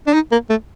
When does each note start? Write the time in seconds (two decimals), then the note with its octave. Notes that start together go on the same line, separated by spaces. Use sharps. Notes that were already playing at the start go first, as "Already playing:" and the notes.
0.07 D4
0.14 D#4
0.32 A#3
0.50 A3